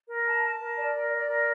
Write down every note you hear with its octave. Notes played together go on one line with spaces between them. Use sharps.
A#4
A5
A5
A#4
D5
A#4
D5
A#4